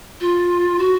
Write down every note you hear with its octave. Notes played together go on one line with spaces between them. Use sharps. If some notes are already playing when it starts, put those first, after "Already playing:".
F4
F#4